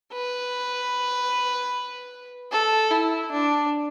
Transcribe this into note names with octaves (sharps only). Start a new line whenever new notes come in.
B4
A4
E4
D4